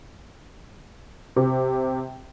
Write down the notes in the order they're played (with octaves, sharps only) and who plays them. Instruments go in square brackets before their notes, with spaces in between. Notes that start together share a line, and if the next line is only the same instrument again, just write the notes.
[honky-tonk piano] C3